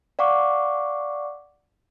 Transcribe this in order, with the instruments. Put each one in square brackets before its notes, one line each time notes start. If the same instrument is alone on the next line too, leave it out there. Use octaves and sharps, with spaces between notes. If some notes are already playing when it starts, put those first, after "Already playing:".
[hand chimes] D5 F5 F#5 C#6 D6